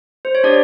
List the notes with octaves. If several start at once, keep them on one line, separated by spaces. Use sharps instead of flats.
C5
C#5
D4 G4 D5